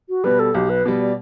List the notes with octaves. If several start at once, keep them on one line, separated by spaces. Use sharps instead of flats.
F#4
B2 G3 B4
A4
B1 G4
B4
B2 G3
D5